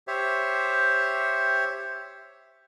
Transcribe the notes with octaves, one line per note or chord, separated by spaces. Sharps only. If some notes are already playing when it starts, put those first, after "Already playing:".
G4 C5 C#5 E5